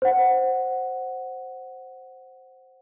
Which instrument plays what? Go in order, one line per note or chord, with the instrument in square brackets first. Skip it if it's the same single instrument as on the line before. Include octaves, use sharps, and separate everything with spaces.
[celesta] C5 F#5